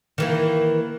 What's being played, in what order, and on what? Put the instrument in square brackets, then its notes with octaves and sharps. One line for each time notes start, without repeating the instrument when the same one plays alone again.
[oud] D#3 E3 A#3